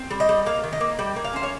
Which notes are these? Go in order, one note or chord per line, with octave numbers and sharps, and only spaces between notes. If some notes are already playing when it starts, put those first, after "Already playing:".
Already playing: C4
G3
D#5
G3
A#3 F5
D#3
D#5
A#3
G3 G5
A#3
F5
C#4 C5
C#5